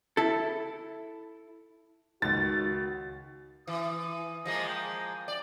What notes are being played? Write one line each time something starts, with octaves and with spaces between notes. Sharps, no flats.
E4 A4
C#2 D#3 F#4 A6
E3 D#6
F3 G#3 A#3 D#5
G5
D5